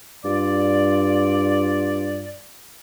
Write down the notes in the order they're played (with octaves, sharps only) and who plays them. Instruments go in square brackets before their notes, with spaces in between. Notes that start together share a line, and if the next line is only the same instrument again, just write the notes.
[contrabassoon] G2 [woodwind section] F4 D5